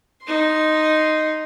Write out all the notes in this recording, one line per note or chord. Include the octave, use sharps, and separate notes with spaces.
D#4 C6